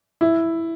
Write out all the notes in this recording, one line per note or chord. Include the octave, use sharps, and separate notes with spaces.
E4